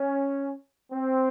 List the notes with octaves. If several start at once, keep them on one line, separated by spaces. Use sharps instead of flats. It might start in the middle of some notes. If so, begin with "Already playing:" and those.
Already playing: C#4
C4